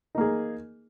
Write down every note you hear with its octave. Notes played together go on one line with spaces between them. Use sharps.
A#3 D#4 G#4